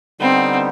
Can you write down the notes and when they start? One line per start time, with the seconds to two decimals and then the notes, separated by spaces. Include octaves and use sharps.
0.20 D3 G3 B3 C4 D#4